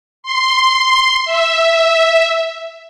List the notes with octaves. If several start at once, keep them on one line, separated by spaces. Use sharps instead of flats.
C6
E5